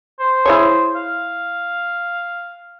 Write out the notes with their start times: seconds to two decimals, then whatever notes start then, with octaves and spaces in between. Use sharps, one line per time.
0.20 C5
0.46 E4 G#4 C#5
0.96 F5